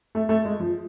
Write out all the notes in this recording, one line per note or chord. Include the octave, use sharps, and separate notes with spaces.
A3
A3
G#3
F3